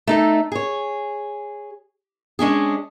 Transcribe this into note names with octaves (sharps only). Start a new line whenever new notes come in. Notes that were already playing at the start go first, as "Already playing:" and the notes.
A3 D#4 A4
G#4 C#5
G#3 C#4 D4 G#4